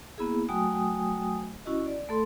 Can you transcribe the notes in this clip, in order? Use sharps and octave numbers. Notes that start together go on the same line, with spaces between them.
A#3 B3 E4 G#4
F#3 A3 F#4 G5 G#5 D#6
C#4 E4 F#4 D#5
D5
A3 A4 C6